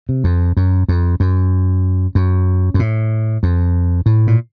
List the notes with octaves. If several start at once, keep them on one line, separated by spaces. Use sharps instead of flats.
C3
F2
F#2
F2
F#2
F#2
F#2
A2
F2
A2
A#2